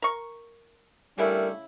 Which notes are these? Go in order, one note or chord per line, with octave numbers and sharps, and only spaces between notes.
A#4 C#6
C#3 G3 A3 D4 E4 A#4